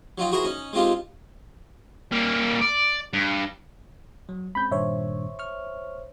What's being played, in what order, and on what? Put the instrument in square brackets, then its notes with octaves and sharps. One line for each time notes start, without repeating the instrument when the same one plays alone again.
[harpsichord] F#3 D#4 F4 G5
E4 F#4 G#4 A#4 C5
C#4 D#4
G#3 C4 D#4 F4 G4
[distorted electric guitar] G3 A#3
D5
G2
[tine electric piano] F#3
[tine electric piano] G#3 C4 C#4 [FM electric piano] B5 G6
[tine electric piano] G2 A#2 D#3 [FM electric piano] C5 C#5 E5
[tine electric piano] C#6 F6